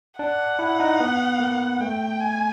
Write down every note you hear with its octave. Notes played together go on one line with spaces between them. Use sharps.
D4 F#5
E4
D#4
B3
A#3
A3 G5
G#5